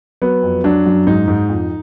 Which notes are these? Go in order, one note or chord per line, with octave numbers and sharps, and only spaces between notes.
F#3 B3
F2
F#3 D4
F#2
G#2 D#4
G#2
F2